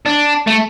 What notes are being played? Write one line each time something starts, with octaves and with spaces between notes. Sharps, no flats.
D4
A3